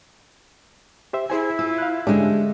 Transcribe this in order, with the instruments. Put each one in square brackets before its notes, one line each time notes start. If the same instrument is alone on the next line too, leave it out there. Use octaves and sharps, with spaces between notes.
[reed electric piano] G4 C5 E5
[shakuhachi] E4 [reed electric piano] G#4 C5 G#5
[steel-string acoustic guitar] F4 [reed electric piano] E6
[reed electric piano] F5 F#6
[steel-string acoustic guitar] D3 G#3 A3 [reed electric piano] C#4 D4 G4